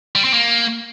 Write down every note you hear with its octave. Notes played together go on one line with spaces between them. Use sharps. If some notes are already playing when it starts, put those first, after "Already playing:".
G3
C4
A#3